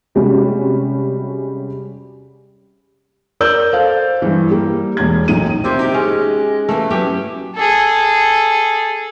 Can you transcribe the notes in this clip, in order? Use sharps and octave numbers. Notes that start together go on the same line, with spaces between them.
C3 G3 G#3 C#4 F#4
A#4 D5 E6 G6
A4 C5 F5
G2 E3
G3 A#3
E1 G#6
B1 F#2 A2 D#4 D#7
C3 A#3 E4 F4
D#4 G4
G#3 C#4
E3 A3 A#3
F#3 B3 C#4 G4
G#4 A4